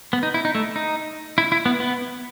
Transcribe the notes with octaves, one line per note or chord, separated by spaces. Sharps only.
B3
D#4
E4
D#4
A3
D#4
E4
E4
B3
B3